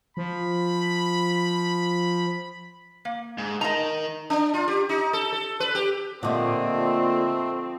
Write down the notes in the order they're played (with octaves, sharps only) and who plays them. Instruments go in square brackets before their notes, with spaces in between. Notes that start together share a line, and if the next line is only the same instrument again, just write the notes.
[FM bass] F3 [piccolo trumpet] B5
[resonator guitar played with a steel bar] A#3
[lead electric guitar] G#2
[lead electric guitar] D#3 D#4 [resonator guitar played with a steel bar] D#5 A#5
[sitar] D4
F4
G4
D#4
A4
A4
B4
G4
[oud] A#2 D3 [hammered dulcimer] F3 G4 D#5 [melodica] A3 [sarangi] C4